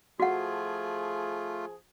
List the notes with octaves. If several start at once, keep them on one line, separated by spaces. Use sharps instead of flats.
F3 A3 F4 F#4 G#4 F#5